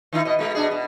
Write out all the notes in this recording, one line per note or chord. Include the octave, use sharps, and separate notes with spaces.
D#3 D#4 E4
B2 D#5
B2 G#3
B2 D4 G#4
B2